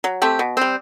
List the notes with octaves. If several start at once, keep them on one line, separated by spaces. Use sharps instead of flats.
F#3
A3 C4 G4
B2
G3 C4